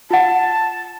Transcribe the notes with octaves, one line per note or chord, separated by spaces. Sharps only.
F4 F#5 A5